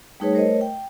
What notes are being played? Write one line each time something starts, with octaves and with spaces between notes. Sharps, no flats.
G3 A3 D#4 G#4 B4 C#5
A3 A#4 C5 C#5 D#5
G5